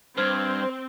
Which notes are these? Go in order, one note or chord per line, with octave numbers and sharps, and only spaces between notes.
G2 C4 C5 F6 G#6